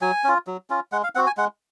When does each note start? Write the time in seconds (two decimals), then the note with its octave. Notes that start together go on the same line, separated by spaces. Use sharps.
0.01 F#3 G#5
0.24 C#4 F4
0.47 F#3
0.70 C#4 F4
0.92 G#3 F#5
1.04 F5
1.15 C4 F#4 F#5
1.27 G#5
1.37 G#3 F#5